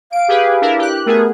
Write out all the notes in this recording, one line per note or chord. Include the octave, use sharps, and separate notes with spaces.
F5 D7
G4 G#4 B4
D4 E4 A#4
G4 F#6
A3 B3 G#4 A#4